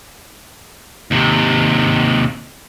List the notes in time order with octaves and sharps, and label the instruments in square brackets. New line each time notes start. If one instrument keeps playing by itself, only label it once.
[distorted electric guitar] D#2 C3